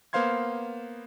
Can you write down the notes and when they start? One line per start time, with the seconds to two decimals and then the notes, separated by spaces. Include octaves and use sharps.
0.13 A#3 B3 C5 F5 C6 G#6